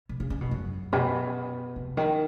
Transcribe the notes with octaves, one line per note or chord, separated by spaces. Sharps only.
B2
C#3
C#3
B2
F#2
B2
C3
D#3